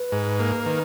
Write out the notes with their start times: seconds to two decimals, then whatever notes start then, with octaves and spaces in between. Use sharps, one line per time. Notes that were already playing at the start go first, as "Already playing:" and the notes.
Already playing: B4
0.12 G#2
0.39 A#3
0.65 D#3 B4